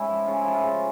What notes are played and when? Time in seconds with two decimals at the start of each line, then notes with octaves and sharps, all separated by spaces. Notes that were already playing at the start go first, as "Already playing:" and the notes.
Already playing: G#2 C#4 E4
0.09 F3
0.27 C#3 F4
0.41 F3 E4
0.54 F4
0.64 C#3